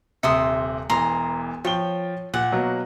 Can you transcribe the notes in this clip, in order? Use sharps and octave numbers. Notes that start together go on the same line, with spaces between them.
D#1 C3 E5 C6 D#6 C#7
E1 E2 A#5 C6
F3 C#5 G5 G7
A#2 F#5
B2 F#3 A#3